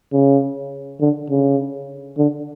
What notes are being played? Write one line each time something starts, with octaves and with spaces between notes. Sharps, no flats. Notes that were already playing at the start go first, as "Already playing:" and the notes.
C#3
D3
C#3
D3